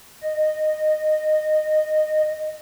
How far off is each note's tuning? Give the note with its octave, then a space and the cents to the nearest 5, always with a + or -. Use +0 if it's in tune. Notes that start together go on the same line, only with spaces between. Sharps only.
D#5 -15